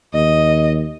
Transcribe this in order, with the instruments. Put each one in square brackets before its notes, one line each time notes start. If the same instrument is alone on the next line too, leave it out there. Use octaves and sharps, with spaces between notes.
[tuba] D#2 [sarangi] D#5